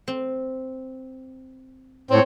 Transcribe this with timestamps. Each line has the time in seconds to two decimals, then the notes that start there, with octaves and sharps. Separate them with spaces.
0.08 C4
2.11 A2 C4 C#5